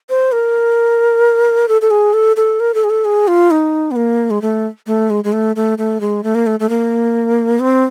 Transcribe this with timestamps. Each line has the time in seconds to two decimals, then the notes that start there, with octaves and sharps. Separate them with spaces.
0.09 C5
0.32 A#4
1.68 A4
1.82 A4
1.91 G#4
2.13 A4
2.36 A4
2.60 A#4
2.74 A4
2.84 G#4
2.90 A4
3.05 G#4
3.28 F4
3.51 D#4
3.91 B3
3.96 A#3
4.31 G#3
4.42 A3
4.87 A3
5.10 G#3
5.24 G#3
5.33 A3
5.56 A3
5.78 A3
6.01 G#3
6.23 A3
6.35 A#3
6.47 A3
6.60 A3
6.69 A#3
7.60 C4